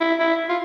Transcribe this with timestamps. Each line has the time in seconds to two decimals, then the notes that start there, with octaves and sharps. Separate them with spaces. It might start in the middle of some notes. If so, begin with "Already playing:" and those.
0.01 E4
0.20 E4
0.49 F4